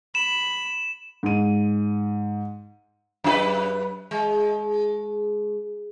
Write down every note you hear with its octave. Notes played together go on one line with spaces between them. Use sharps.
B5 E7
G#2 D#7
F#2 E4 B4
G#3